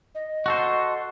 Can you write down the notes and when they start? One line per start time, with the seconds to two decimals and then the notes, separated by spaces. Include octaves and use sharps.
0.15 D#5
0.46 F#4 A4 C5